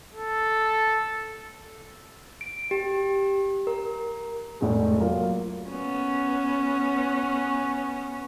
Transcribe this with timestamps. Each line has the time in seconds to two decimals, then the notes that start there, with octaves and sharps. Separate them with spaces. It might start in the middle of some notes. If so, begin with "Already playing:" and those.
0.14 A4
2.41 D7
2.71 G4
3.67 A#4
4.61 F1 A2 G#3
4.99 F#3 A#3 F4
5.70 B3 C#4